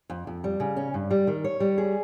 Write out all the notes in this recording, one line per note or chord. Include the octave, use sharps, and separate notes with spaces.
F2
F2
G3
C#3
C#4
G2
G3
D#3
C#5
G3
G#4